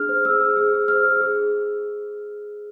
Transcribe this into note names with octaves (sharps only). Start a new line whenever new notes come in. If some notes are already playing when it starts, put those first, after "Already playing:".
Already playing: D4 G#4 F6
C5
G#4 E6
G#4
G#4
G#4
C5 F6
G#4
G#4